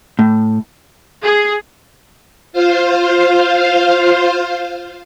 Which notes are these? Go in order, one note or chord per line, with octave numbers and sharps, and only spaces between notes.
A2
G#4
F4 C5 F5